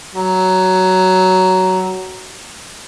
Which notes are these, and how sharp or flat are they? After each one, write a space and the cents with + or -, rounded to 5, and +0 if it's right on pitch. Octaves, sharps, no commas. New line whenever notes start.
F#3 +10